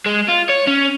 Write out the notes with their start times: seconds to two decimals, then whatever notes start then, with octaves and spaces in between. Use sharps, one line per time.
0.06 G#3
0.29 F4
0.50 C#5
0.68 C#4